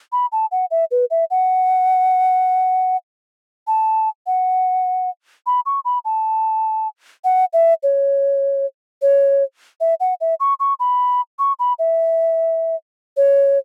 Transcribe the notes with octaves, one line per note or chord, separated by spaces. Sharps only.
B5
A5
F#5
E5
B4
E5
F#5
A5
F#5
B5
C#6
B5
A5
F#5
E5
C#5
C#5
E5
F#5
E5
C#6
C#6
B5
C#6
B5
E5
C#5